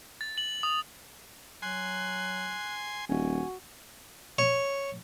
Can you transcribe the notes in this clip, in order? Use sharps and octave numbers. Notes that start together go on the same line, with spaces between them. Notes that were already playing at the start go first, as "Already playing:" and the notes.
A6
F#7
D#6
F#3 G#5 C6 F#6
D#1 F#4 G#5
C#5